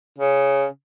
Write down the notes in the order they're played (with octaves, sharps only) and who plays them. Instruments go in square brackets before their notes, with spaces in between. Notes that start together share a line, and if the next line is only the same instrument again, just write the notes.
[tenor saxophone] C#3